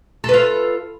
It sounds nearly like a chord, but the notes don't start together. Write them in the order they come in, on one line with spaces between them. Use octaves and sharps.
A4 B4 F4